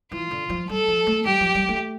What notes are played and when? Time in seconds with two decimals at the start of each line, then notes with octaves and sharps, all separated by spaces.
0.12 E3 F4
0.31 D3
0.49 F3
0.69 G3 A4
0.88 F3
1.07 A3
1.26 G3 G4
1.41 F3
1.55 G3
1.69 A3